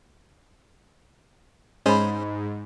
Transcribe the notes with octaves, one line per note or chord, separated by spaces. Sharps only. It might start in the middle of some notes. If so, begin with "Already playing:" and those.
G#2 C#4 G#4 C5 D#5 B5